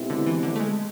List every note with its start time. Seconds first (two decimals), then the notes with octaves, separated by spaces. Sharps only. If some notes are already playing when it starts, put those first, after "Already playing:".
Already playing: B2 G#3 C4 E4 G4
0.10 D3
0.26 E3
0.43 D3
0.56 A3
0.60 G#3